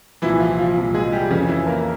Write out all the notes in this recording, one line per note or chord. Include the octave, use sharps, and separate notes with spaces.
C2 A#2 E3 F3 E4
F3 F4
F3 F4
C2 A#2 F3
G#3 G#4
G3 G4
F2 C#3 E3 C#4
E3 E4
A#3 A#4